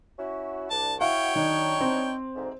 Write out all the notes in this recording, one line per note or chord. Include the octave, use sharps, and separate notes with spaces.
C#4 E4 F#4
C2 D4 A5
E4 F#4 C#5 F5 G5
D#3 F#3 D4 D#4
C4
D2 G#2